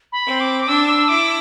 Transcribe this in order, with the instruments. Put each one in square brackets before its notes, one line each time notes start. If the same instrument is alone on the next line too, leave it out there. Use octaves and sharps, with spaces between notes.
[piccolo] B5
[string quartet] C4
[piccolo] D6
D6
[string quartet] D4 [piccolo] E6
[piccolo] E6
[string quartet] E4 [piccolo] D6